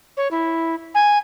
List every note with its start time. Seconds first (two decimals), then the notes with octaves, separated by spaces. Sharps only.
0.17 C#5
0.31 E4
0.95 G#5